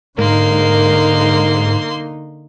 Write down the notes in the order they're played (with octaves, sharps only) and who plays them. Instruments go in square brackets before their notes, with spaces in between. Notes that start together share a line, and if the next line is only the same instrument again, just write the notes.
[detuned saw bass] G#2 [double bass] D3 D#4 [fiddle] A#3 C6 [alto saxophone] A#4